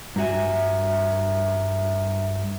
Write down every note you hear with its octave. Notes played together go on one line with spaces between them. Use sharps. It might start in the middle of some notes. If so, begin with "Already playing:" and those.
G2 F#4 E5 G#5 A#5